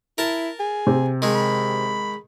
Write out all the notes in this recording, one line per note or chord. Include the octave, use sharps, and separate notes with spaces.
E4 A#4 A5
G#4
C3
D#3 G#3
B5